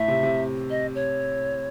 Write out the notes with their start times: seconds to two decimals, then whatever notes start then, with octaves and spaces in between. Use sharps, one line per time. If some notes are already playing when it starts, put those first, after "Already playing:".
Already playing: A2 E5
0.08 C3
0.23 C3
0.70 D#5
0.95 C#5